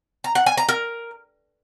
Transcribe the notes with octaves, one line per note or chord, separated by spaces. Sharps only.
A#5
F#5
G#5
A#5
A#4